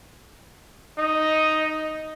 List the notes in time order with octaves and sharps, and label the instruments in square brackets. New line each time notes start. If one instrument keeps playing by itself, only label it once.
[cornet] D#4